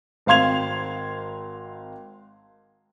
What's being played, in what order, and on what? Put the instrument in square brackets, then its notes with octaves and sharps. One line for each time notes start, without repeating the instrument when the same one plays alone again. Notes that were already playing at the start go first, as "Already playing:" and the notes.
[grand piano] G#1 C4 F5 C6 G#6 F7